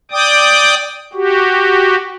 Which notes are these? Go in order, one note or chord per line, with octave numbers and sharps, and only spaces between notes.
D5 G5 D6 D#6
F#4 G4